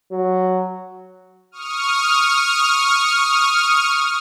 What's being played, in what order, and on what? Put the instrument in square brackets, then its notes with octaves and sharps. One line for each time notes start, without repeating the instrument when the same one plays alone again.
[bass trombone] F#3
[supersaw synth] C#6 D#6 F6